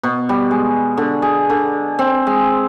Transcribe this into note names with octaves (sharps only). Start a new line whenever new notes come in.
B2
G3
G#3
D3
G#4
D3
C4
G#3